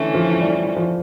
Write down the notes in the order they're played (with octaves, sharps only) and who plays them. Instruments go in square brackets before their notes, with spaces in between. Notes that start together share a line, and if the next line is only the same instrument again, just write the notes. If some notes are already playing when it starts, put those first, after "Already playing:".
Already playing: [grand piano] D3 [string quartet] E3 A3 C#4
[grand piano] F3
G3
G3
F3